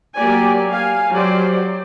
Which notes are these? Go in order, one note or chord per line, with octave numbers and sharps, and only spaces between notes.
F#3 A#3 G4 D5 G#5
F5 G#5
F#3 G4 C5 D5